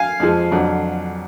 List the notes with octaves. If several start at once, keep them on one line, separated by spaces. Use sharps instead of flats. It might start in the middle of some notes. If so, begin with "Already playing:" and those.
Already playing: F5 G#5
F2 F3 G#3
F2 D3 F#3